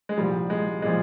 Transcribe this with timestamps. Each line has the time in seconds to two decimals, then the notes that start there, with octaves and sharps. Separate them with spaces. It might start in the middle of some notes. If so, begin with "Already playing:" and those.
0.09 G#3
0.17 C2 A#2 F3 G3
0.50 G#3
0.82 A#2 F3 G#3